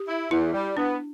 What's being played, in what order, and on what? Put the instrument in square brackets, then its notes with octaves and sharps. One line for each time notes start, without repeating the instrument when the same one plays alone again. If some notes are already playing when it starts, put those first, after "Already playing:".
Already playing: [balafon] G4
[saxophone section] E4
[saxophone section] E2 [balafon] E4
[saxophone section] G3
[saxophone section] B3 [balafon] D4